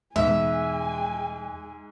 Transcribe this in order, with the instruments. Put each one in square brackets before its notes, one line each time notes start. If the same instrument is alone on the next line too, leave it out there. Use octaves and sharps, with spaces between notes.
[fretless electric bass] E2 B2 [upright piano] G#2 [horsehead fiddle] G#3 G#5 [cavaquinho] E5